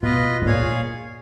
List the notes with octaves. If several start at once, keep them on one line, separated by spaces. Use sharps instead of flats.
B2 F4 B4 D#5
G#2
A#2 G#4 C#5 F5 G#5